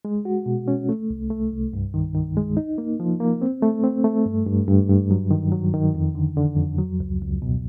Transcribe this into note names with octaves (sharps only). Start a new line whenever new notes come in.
G#3
F#4
B2
C#4
A3
C2
A3
C2
G2
D#3
D#3
G#3
D#4
A#3
F3
A#3
C4
A3
C4
A3
G2
G2
G2
G2
F#3
D#3
F#3
D#3
F2
D3
D3
F2
F#3
C#2
C#2
B2